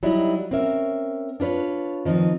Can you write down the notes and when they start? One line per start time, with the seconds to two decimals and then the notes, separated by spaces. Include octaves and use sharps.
0.03 F#3 G3 D#4 E4
0.51 C4 C#4 A#4 E5
1.40 D4 F4 B4 C#5
2.05 D#3 F3 C4 D#4